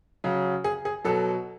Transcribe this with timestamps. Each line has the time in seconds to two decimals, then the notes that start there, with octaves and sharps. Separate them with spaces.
0.24 C#3 F#3
0.64 G#4
0.85 G#4
1.04 B2 F#3 A4